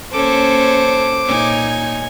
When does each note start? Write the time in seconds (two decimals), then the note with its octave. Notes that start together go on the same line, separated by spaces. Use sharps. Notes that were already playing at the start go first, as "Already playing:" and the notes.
0.13 A#3 C#4 A4 C5 C#5 D6
1.25 A#2 D#4 C#5 G#5